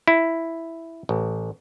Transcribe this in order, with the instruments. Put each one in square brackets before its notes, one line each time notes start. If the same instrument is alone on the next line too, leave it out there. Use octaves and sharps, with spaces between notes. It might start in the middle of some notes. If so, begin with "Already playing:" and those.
[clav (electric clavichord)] E4
A1